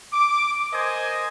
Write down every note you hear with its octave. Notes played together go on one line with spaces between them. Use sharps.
D6
A#4 C5 D#5 G#5